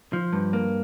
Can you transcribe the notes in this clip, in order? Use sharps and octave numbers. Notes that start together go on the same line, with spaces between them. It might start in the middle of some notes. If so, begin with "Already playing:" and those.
F3
G2
A#3